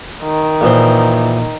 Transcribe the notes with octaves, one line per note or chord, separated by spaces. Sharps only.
D#3
A#1 E3 C5